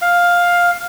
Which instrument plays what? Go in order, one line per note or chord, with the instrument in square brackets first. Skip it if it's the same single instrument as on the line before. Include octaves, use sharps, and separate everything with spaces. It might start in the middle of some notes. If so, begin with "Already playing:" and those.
[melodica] F5